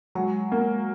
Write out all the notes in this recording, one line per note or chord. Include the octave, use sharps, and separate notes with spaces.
F#3 G#3
A#3